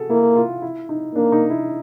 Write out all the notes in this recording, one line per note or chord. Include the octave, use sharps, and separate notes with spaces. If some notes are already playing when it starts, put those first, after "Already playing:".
Already playing: F#4 G#4 A4
A#3 E4
F4
E4
D#4
A#3 D4
D#4
E4